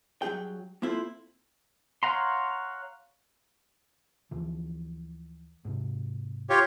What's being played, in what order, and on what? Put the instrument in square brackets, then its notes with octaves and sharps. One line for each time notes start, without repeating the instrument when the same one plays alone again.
[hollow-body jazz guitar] G2 F#3 D#4 G#4 G5
A#3 C4 E4 F4 A4 C5
[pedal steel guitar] C#5 F5 F#5 A#5 C6
[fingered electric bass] D2 E3 F3
G#2 C3
[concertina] F4 G4 C#5